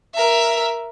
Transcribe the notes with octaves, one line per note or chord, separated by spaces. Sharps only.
A#4 E5